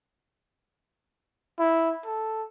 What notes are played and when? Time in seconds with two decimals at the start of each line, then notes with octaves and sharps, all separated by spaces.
1.59 E4
2.05 A4